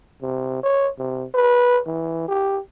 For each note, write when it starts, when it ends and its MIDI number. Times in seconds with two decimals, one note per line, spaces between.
0.22 0.59 48
0.63 0.89 73
0.99 1.25 48
1.34 1.80 71
1.87 2.27 52
2.28 2.60 67